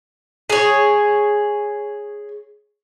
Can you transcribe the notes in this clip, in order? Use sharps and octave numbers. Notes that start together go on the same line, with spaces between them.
G#4 C#5